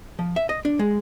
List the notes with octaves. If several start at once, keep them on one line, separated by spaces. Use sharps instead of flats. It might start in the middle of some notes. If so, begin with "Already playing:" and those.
F3
E5
D#5
D4
G#3